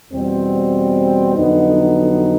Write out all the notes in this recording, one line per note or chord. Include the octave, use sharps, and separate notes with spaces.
E2 B2 G3 C4
F2 D3 F#3 B3 D#4